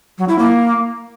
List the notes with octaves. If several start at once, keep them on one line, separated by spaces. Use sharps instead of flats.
F#3
E4
A#3